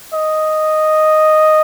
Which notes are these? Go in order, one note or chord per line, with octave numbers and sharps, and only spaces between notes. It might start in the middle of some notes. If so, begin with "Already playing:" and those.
D#5